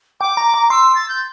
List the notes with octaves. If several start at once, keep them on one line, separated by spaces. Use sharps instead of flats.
G5 D6
A#5
A#5
C6 E6
A6
G6